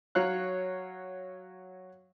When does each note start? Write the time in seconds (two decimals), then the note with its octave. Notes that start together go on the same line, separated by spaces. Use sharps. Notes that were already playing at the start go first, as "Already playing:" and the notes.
0.15 F#3 C#5 F5 F#6